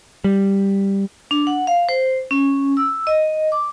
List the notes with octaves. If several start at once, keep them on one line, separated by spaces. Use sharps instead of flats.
G3
D4
F#5
F5
C5
C#4
E6
D#5
D6